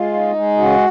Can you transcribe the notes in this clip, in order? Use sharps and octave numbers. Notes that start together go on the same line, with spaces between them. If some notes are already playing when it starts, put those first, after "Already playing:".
Already playing: G#3 F4
D#4
G#3
C#3 F#4